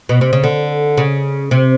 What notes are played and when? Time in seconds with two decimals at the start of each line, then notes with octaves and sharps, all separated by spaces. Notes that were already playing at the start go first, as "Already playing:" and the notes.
0.09 B2
0.21 C3
0.33 C#3
0.44 D3
0.98 C#3
1.51 C3